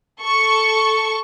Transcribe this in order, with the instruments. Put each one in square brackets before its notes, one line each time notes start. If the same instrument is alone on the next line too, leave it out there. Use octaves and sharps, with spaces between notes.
[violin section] A4 C#6